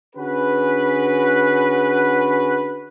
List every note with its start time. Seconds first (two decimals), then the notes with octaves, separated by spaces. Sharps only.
0.15 D3 C#4 F#4 G#4 B4